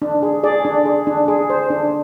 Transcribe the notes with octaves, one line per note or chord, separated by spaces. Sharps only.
D4
G#4
G#4 D5
D4
G#4
D4
G#4
C5
D4